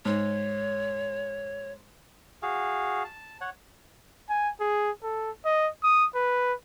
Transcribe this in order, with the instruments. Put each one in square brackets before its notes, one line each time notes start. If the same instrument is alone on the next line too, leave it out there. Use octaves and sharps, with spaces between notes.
[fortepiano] G#2 [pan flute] C#5
[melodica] F#4 G#4 F5
A5
C#5 F#5
[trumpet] G#5
G#4
A4
D#5
D#6
B4